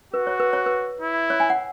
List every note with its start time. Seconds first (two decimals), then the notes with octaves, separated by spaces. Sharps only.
0.13 F#4 B4
0.27 C#5
0.40 B4
0.53 C#5
0.66 B4
1.01 E4
1.30 C#5
1.40 G#5
1.50 F#5